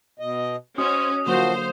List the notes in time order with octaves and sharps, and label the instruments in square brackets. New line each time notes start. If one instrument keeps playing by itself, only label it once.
[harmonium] B2 D#5
[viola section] C#4 [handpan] F#4 D#5 [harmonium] C5 [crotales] D#6
[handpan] D3 F#3 A#3 [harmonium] F3 F#4 [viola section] C5